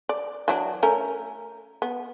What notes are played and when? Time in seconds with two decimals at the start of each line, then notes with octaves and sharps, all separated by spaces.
0.09 D5
0.48 E3 F#3 D4
0.83 A3 C#4 A#4
1.82 B3